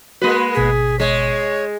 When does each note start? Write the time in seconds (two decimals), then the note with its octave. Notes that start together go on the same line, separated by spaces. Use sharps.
0.22 G#3 A#3 F#4 B4 C6
0.55 G#1 B2 G#4 B6
1.00 G#3 C#5